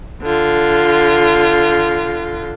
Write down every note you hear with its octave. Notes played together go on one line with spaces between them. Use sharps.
D3 F4